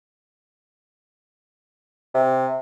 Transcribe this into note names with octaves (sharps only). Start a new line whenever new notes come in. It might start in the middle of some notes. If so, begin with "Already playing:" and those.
C3